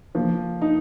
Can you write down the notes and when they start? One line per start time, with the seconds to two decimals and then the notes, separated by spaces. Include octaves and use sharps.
0.15 F3 A#3
0.62 D#4